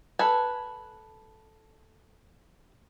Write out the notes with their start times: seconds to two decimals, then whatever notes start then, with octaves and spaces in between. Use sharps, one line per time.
0.19 A4 B4 G#5